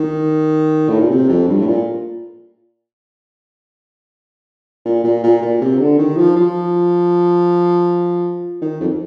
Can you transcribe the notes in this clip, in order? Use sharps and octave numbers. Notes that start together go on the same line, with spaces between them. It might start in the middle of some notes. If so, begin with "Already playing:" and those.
Already playing: D#3
A2
A#2
C3
F2
G2
A2
A#2
A#2
A#2
A#2
A#2
C3
D3
D#3
F3
F3
D#3
F2